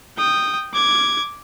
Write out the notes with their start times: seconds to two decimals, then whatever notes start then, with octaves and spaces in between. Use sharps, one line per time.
0.18 G5 D#6
0.73 D6 G#6